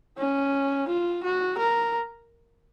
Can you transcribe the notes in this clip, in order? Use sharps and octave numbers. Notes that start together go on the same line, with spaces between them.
C#4
F4
F#4
A#4